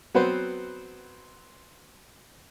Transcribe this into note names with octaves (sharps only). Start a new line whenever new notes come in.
F#3 B3 C4 B4 C5